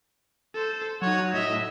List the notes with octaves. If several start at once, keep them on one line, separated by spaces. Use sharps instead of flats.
A4 C5
F#3 D#4 C#5 F#5
A2 D#5 E5